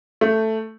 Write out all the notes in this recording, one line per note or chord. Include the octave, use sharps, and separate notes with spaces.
A3